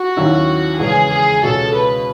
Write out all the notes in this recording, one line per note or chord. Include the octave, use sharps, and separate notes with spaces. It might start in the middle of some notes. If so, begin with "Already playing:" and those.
Already playing: F#4
D#2 D#3 F#3 C#4 E4
E2 C#3 G#3 C#4 G#4
G#4
C#2 B2 G#3 C#4 F#4 A4
B4